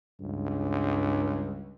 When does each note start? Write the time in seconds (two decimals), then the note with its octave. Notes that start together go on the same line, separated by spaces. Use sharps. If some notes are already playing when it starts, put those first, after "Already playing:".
0.20 C#2 G2